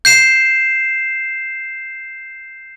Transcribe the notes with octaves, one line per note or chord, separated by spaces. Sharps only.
G6 C7 E7